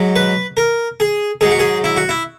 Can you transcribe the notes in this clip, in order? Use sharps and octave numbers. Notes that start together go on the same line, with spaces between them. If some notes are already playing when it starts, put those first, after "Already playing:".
Already playing: G#2 F#3
B4
A#4
G#4
G#2 F#3 G#4
F#4
G#4
E4
F#4
E4